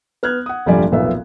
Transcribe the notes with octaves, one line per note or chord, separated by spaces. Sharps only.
B3 F6 F#6 G#6
F#5 D#6
F1 A#1 G2 G3 D5 G#5
F1 B1 A#2 B3 E5